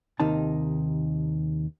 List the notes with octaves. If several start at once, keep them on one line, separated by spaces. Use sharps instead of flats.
D#2 C3 D#3 D#4 A5